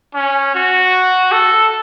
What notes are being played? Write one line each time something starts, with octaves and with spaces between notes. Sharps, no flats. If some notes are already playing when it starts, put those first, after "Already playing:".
C#4
F#4
A4